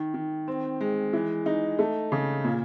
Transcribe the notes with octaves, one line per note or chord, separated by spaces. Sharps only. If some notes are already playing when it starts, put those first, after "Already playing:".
Already playing: D#3
D#3
C4
G#3
E3
D#4
A3
C#3
A#2